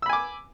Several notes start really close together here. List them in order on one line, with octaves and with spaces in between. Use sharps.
E6 B5 G#5 D6